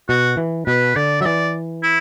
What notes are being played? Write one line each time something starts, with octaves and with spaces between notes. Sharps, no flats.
B2 F#4
E3
B2 B4
D3 D5
F#3 E5
E3 D5
E4